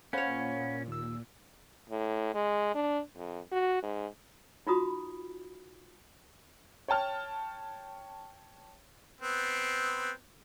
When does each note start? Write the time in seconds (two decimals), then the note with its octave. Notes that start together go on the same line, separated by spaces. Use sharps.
0.13 A#2 C#4 C5 C#5 F5 F#5 B5
0.88 D#2 E6
1.90 A2
2.34 G#3
2.75 D4
3.16 F2
3.52 F#4
3.83 G#2
4.67 D#4 F4 F#4 A#5 B5 D#6
6.88 C#5 G5 A5 F6
9.21 B3 C4